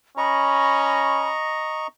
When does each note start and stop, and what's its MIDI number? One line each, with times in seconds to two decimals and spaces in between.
0.18 1.33 61
0.18 1.87 75
0.18 1.87 82
0.18 1.29 83
0.18 1.87 85